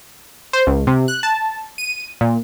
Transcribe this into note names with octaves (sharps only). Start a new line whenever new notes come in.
C5
C#2
C3
F#6
A5
D#7
A#2